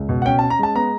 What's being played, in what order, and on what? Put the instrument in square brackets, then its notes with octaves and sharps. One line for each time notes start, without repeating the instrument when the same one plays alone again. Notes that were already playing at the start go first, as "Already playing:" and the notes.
Already playing: [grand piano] C#2
B2
F#5
C#4 G5
C#4 A5
A#5
G#3 A5
B3 A#5